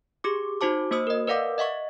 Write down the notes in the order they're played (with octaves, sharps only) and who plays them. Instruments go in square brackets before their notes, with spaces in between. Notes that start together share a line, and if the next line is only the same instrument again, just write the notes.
[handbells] G4 G#4 D6
D#4 F#4 C5 A5 D6
A#3 F#4 C5 D#6 E6
A#4 D#5
A#4 B4 D5 F5 F#5 D6
D#5 E5 F#5 C#6